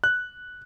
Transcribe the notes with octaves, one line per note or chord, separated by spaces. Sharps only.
F#6